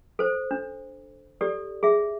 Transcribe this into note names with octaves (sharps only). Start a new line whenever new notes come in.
A4 C5
D4
G4 A4 D5
G#4 E5